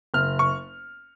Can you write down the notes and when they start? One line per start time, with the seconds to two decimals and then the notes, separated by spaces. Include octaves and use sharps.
0.14 F#1 F6
0.39 C#6